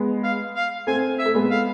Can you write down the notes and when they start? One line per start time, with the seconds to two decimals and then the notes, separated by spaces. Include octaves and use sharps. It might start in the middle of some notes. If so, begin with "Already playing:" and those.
Already playing: G#3 B3
0.24 F5
0.56 F5
0.87 A3 C4 G#5
1.18 E5
1.26 A3
1.35 G#3 B3
1.51 F5